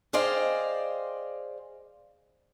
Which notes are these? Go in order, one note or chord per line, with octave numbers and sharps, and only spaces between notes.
G#4 C5 D5 D#5 F5 G5